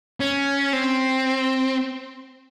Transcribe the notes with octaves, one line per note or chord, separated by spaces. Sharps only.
C#4
C4